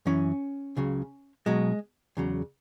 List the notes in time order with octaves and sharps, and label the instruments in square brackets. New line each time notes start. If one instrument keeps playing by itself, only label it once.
[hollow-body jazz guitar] F#2 E3 C#4
C#2 C#3 F#3
B1 B2 F#3 G#3
E2 C#3 F#3